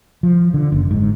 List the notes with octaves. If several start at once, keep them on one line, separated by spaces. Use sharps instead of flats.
F3
D3
F#1
G#2